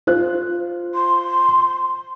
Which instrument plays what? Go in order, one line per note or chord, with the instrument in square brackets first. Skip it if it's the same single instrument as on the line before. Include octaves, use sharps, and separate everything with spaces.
[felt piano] F4 C5 F#6
[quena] C6